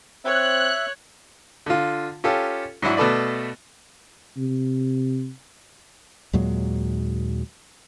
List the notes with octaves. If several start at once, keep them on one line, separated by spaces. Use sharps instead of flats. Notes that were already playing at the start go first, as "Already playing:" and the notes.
C4 C#5 E5 F#6
D3 F4
C#4 F4 G4 A4
G#2 F#3 D4 E4 F#4
B2 A3 A4 B4 D5
C3
D#2 A#2 F#3 G#3